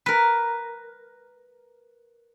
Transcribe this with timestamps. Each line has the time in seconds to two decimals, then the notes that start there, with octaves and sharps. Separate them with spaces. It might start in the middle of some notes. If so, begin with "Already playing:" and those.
0.06 A#4 B4